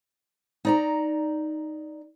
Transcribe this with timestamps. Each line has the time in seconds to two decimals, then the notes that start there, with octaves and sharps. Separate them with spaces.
0.65 D#4 D5 A#5